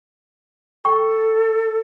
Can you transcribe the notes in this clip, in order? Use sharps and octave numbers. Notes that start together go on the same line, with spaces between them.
A4 G5 C#6